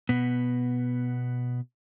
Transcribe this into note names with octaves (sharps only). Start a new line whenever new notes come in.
B2 B3